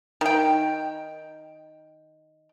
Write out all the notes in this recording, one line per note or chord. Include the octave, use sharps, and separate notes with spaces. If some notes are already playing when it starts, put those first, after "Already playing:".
D#3 G5